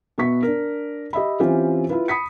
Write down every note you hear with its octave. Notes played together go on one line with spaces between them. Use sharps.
B2 B3 E5 C#6 B6
D4 A#4
G4 D#5 E5 B5
E3 C4 C#4 F4 G4
E4 F4 B4
B5 D#6 B6 C#7